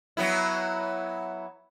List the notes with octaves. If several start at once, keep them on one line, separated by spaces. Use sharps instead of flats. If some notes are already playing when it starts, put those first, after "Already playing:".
F#3 B3 E4